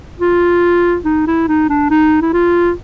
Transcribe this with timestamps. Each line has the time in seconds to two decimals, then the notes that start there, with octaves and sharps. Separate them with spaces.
0.20 F4
1.05 D#4
1.27 E4
1.48 D#4
1.69 D4
1.90 D#4
2.22 E4
2.34 F4